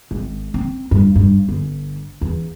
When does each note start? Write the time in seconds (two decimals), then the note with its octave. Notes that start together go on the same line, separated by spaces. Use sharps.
0.11 G#1
0.54 C4
0.91 G2
1.15 G2
1.48 G1
2.21 E2